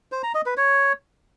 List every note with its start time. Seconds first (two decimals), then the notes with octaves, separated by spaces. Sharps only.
0.12 C5
0.23 A#5
0.35 D#5
0.46 B4
0.57 C#5